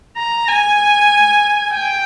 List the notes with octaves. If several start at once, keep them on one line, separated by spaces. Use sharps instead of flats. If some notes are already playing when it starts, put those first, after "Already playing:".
A#5
G#5
G5